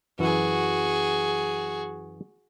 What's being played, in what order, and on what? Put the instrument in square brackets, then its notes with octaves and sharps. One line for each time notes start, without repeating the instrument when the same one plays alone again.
[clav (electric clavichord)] F#2 E3 [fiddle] F#4 G#4